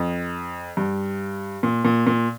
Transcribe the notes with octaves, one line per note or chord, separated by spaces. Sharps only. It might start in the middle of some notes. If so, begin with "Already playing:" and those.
Already playing: F2
G2
A#2
A#2
A#2